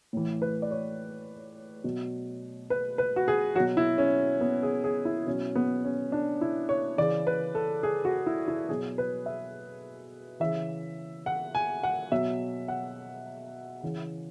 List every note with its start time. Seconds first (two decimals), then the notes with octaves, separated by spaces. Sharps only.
0.13 A2 E3
0.42 B4
0.62 D5
0.71 C#5
1.84 B2 F#3
2.70 B4
2.98 B4
3.16 F#4
3.28 G#4
3.55 F#3 F#4
3.60 B2
3.77 E4
3.98 C#4
4.41 B3
4.63 G#4
4.84 G#4
5.05 E4
5.27 B2 F#3 C#4
5.55 B3
5.84 C#4
6.12 D4
6.41 E4
6.69 C#5
6.98 C#3 E3 D5
7.27 B4
7.55 A4
7.83 G#4
8.05 F#4
8.26 E4
8.48 E4
8.69 B2 F#3 G#4
8.98 B4
9.26 E5
10.40 C#3 E3 E5
11.26 F#5
11.55 G#5
11.83 F#5
12.12 B2 F#3 E5
12.68 F#5
13.83 C#3 E3